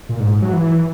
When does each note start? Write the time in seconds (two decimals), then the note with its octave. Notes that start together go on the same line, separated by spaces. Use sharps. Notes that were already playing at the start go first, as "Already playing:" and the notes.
0.09 A#2
0.20 G#2
0.31 G#2
0.42 F#3
0.53 E3